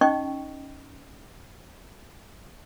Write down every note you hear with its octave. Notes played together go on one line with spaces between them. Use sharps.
C#4 D#4 D#5 G5 C#6